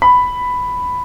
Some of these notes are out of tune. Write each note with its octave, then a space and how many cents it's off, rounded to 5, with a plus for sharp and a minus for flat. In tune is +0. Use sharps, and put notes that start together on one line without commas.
B5 +5